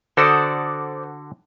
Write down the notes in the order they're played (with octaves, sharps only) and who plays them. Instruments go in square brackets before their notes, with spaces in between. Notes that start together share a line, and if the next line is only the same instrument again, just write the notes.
[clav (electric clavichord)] D3 F#4 A4 [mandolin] C5 D5 D#6